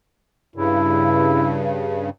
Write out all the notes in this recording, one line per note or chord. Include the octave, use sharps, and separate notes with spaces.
G2 C#3 E4